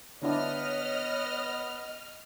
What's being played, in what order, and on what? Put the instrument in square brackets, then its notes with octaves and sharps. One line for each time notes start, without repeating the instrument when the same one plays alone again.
[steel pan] D3 D4 E4 [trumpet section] B3 [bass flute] C#5 [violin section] D#5 F6